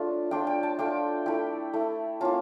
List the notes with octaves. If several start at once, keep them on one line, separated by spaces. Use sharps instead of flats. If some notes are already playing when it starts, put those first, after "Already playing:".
Already playing: A3 D4 F4
A3 D4 F4 G5
G5
A5
A3 D4 F4 G5
A3 E4 G5
A3 E4
A#3 C#4 F4 A5